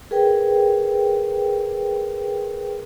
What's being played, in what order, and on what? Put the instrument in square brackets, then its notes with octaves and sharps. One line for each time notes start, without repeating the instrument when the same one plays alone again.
[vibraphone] G#4 A#4 B4 G5